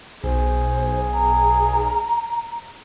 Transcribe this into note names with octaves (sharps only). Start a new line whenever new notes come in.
B1 G#4 C5
A#5